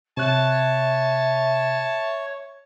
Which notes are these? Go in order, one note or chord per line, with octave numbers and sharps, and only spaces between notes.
C3 C#5 E5 A5 F#6